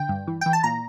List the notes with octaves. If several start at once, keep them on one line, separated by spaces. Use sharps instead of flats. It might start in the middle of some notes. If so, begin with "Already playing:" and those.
Already playing: D3 G5
G2
E3
E3 G5
A5
A#2 A#5